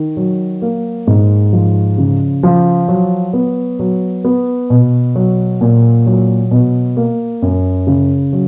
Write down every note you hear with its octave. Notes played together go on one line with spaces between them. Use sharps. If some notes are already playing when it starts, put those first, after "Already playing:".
Already playing: D#3
F#3
A#3
G#2
F3
C#3
F3
F#3
B3
F#3
B3
B2
F#3
A#2
F#3
B2
A#3
F#2
C#3
F#3